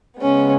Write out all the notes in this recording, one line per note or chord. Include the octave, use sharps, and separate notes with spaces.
C#3 G#3 B3 C#4